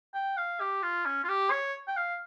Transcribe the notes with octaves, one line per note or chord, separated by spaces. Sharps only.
G5
F5
G4
F4
C#4
F4
G4
C#5
G5
F5